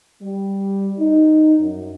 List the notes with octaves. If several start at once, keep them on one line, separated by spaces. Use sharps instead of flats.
G3
D#4
F#2